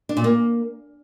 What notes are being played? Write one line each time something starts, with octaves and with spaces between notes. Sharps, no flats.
D4
A#2
A#3